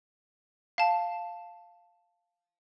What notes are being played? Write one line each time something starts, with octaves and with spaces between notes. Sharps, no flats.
F5 A5